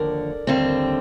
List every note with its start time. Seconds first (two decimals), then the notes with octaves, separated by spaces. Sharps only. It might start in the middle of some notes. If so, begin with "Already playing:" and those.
Already playing: D#2 D3 F3 A#4 D5
0.47 D#2 D3 G3 C4